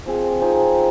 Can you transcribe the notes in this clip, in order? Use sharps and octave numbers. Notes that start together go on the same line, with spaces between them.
F3 C4 G#4
F3 C4 D#4 G#4